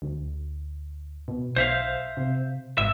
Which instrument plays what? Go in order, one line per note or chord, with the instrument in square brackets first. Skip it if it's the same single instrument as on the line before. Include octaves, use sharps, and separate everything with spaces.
[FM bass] D2
B2
[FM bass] B1 [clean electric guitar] C5 E5 F5
[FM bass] C3
[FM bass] G#1 [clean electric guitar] E5